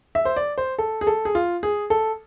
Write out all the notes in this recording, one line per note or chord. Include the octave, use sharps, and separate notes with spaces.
E5
C5
D5
C5
A4
G#4
A4
G#4
F4
G#4
A4